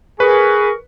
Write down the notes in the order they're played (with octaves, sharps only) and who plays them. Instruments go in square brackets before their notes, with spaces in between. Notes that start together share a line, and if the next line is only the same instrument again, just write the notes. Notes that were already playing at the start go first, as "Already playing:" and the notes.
[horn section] G#4 [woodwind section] A#4 C#6 [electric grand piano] B4